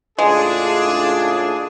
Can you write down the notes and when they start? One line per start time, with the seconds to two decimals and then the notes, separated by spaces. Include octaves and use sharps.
0.19 A2 C#3 G#3 D4 F4 G#4